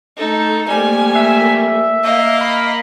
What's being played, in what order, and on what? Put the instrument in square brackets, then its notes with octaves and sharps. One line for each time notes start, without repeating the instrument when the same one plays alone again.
[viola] A3 A4 [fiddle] D#4
[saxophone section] F2 G3 [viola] A3 A#3 [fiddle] G#5
[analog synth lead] E5
[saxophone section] A#3 [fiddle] D#5 F5
[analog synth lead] B5